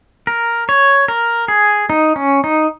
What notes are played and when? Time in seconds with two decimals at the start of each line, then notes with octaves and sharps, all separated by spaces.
0.27 A#4
0.69 C#5
1.08 A#4
1.48 G#4
1.90 D#4
2.16 C#4
2.44 D#4